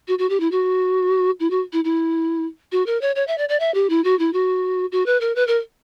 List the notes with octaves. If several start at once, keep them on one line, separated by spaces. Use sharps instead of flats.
F#4
F#4
G4
E4
F#4
E4
F#4
E4
E4
F#4
A#4
C#5
C#5
E5
D5
D5
E5
G4
E4
F#4
E4
F#4
F#4
B4
A#4
B4
A#4